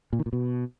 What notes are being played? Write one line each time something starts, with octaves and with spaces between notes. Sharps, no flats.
A#2
D#3
A#2
B2